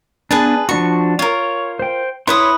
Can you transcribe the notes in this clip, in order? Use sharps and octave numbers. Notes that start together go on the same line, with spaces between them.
B3 D4 G#4 B4 A5
F3 D4 F#4 C#6
F4 A#4 C#5
C5 G5
E4 B4 C#5 C6 D#6